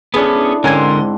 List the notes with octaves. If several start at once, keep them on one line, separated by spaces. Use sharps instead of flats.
B3 C#4 D4 E4 G#4 A4
G#2 D3 C4 C#4 A#4 G#5 C6 G#6